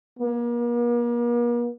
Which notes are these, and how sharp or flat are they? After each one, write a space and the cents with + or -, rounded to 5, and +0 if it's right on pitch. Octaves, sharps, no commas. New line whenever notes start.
A#3 +40